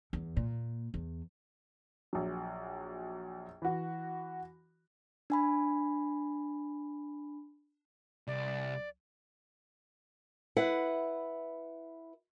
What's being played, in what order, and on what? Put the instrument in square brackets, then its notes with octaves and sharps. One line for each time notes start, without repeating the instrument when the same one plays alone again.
[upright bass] E2
A#2
E2
[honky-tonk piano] A#1 F#3
E3 F#4
[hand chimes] D4 G#5 B5
[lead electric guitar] C2 [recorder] D5
[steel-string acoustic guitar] E4 B4 F#5